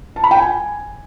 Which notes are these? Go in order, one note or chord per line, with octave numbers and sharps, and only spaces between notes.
A5
B5
G5
G#5